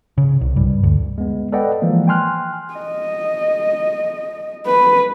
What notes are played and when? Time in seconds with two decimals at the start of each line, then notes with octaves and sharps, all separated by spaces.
0.18 C#3
0.41 C2
0.56 G2
0.83 D2
1.18 G#3 B3
1.52 A4 B4 D5 D#5 F#5 G5
1.82 E3 F3 G#3 A#3
2.07 G5 G#5 C6 F6 F#6
2.74 D#5
4.66 B4